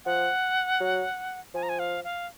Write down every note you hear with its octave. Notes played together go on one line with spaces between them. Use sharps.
F3 F#5
F#3
F3 G#5
A#5
G#5
F5
F5